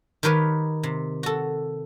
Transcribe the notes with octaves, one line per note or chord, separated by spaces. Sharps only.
D#3 D#4 G4 A#4 B4 C#5
C3
F#4 A4